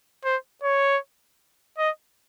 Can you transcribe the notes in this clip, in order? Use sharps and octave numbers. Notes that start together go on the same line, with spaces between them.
C5
C#5
D#5